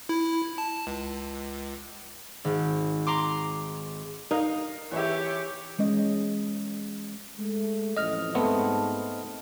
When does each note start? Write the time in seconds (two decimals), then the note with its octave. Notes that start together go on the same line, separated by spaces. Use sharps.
0.09 E4
0.58 A5
0.87 C#2
2.44 G#1
3.07 A#5 C6 D6
4.31 D#4 A#4 F5
4.92 E3 E4 G4 C#5 E5
5.78 E3 G#3 C#4 D#5
7.38 G#3 A3
7.97 A1 F2 D#5 F6
8.35 G#2 A3 B3 C4 A5